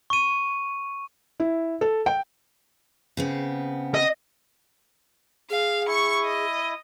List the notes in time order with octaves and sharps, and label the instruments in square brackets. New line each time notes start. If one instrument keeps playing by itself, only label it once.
[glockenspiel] C#6 D#7
[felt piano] E4
A4
G5
[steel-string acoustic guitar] C#3 B3 C4
[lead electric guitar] D#5
[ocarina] G#4 [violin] F5
[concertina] E4 [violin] C#6 C#7
[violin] D#5